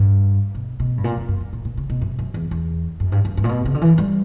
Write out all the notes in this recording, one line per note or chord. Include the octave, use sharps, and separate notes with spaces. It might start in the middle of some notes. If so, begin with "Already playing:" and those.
Already playing: G2
B2
B2
G2
A#2
F#2
F#2
G2
A#2
A#2
C#3
B2
F#2
F#2
E2
E2
F#2
G2
F#2
G2
A#2
B2
C#3
D3
E3
G3